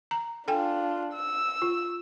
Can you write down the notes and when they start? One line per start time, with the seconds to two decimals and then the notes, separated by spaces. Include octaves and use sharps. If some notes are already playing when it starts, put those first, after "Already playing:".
0.11 A#5
0.48 D4 F4 A4 G5 G#5
1.14 E6
1.62 F4